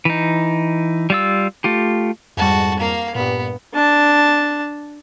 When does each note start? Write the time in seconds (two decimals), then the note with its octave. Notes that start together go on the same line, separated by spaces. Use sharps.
0.05 E3 D#4
1.10 G3 F4 E6
1.64 A3 F4 G4
2.37 F2 G#2 G3 F#4 A5
2.79 A#3 F5
3.15 G2 A#2 B3
3.74 D4 A5